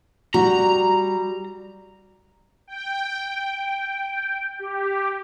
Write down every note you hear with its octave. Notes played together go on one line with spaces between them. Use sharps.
G3 F#4 A#5
G5
G4